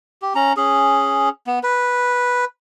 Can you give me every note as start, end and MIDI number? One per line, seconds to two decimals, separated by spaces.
0.22 0.33 67
0.35 0.53 61
0.35 0.53 82
0.57 1.29 61
0.57 1.29 68
1.47 1.59 59
1.63 2.45 71